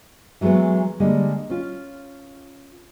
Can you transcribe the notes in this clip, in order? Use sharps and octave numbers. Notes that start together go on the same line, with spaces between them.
E3 F#3 G#3 A3 B3
D3 G3 G#3 A#3
C#4 F4